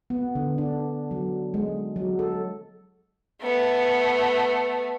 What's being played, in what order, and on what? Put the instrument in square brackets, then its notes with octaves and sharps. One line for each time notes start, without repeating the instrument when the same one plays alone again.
[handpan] B3
D3
D4
F#3
G#3
F#3
A4
[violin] A3 B3